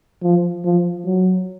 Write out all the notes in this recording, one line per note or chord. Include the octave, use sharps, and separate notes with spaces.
F3
F3
F#3